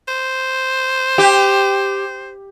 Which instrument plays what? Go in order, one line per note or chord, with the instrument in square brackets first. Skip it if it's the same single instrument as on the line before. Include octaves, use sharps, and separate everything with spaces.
[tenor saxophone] C5
[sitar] G4